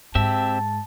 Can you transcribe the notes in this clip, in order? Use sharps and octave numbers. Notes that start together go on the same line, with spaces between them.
G#2 C4 G4 E5 A5